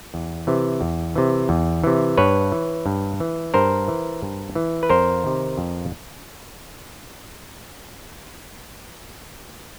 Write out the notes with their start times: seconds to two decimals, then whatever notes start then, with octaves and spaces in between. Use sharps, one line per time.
0.14 E2
0.47 C3 E3
0.81 E2
1.16 C3 E3
1.49 E2
1.84 C3 E3
2.18 G2 B4 C#5
2.52 E3
2.86 G2
3.20 E3
3.54 G2 A#4 C5
3.88 E3
4.22 G2
4.55 E3
4.83 B4
4.89 F2 A#4 C5
5.24 C3 D#3
5.58 F2